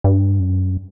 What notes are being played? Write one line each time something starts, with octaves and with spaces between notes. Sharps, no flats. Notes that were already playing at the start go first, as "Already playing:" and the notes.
G2
F#2